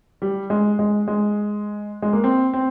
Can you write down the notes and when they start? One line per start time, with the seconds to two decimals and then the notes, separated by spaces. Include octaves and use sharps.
0.22 G3
0.50 G#3
0.79 G#3
1.08 G#3
2.02 G#3
2.13 A#3
2.24 C4
2.53 C4